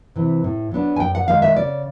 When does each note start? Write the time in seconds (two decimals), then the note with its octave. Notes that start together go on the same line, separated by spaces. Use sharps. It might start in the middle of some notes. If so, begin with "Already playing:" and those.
0.16 C3 E3
0.44 A2
0.71 F#3 B3 D4
0.96 G#5
1.00 F#2 G5
1.15 F#5
1.28 D#3 G#3 F5
1.42 E5
1.56 C#3 D5